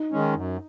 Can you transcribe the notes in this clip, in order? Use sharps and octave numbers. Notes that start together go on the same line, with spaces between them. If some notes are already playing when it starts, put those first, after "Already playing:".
Already playing: D#4
D#3 G#3 C#4
F#2